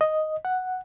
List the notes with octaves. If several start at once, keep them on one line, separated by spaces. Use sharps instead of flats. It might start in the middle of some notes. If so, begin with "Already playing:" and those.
D#5
F#5